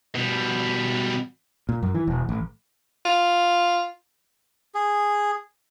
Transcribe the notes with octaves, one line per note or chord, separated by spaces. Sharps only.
B2 G3
A#2
F#2
E3
E1
A1
F4
G#4